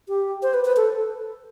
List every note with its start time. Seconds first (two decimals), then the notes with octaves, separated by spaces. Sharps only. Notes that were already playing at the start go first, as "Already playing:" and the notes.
0.08 G4
0.43 C5
0.54 B4
0.65 B4
0.77 A4